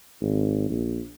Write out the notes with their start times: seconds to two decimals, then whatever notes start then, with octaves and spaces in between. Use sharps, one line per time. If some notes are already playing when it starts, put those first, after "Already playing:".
0.21 G#1
0.70 A#1